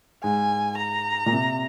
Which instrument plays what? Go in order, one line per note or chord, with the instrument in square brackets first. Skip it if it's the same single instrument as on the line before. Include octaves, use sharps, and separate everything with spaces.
[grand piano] G#2 [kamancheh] G#5
[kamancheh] A#5
[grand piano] A#2
C3